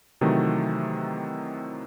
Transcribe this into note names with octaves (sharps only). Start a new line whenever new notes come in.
C3 D#3 E3 F#3 A3